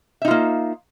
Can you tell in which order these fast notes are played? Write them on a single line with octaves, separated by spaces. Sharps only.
E5 D#4 F4 A#3